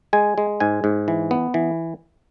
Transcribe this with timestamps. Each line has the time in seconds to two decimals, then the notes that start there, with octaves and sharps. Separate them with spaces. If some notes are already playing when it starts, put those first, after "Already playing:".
0.13 G#3 G#5
0.38 G#3
0.60 G#2 G#5
0.84 G#2
1.08 E3
1.31 B3
1.54 E3